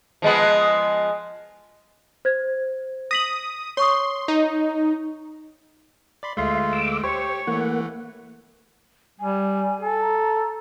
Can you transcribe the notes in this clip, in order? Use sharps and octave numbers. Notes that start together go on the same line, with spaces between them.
F3 G#3 B3
C5 G#6
D#6 A#6 B6 F#7
C#5 C6 C#6 D#6
D#4
D5 B5 C6
D2 G#3 A3 F4 E5 C6
D6 E6
G4 C5 C#5 C#6
E3 A3 A#3 F#5
G3 G#5
A4
A#5